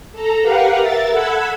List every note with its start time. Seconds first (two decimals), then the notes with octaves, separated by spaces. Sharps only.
0.12 A4 A#5
0.42 G4 A#4 B4 F5 F#5
0.78 A#4 E5 A6
1.10 A4 F#5 B5 E6 F#6 G#6